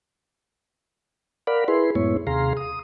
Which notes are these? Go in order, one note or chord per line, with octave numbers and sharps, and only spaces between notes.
A#4 D5 F5 F#5 B5
E4 G#4 B4 C6
F#2 A2 G#3 B3 E4 C#5
D#2 C3 G#4 F5 A#5 C6
D#6